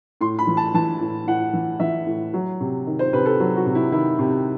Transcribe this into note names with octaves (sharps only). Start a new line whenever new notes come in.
A2 C6
B5
E3
A5
E3 A5
A2
A2 F#5
E3
E3 E5
A2
F#3
C3
D#3
C5
C3 B4
A4
F#3
F#4
C3
E4
D#3 E4
C3